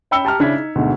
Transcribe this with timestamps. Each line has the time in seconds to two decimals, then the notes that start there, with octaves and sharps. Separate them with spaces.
0.11 C#4 G5 B5 E6 C#7 G7
0.25 G4 A5 A#5 F6
0.40 C#3 D4 E4 F6 G#6 B6
0.54 D#4
0.75 D2 G#2 B2 D3